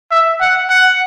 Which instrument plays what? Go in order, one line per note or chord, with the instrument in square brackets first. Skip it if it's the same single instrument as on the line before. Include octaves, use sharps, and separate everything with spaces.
[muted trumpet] E5
F#5
F#5